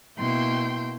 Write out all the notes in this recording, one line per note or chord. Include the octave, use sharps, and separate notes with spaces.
B2 A#3 E4 G5 C6 G6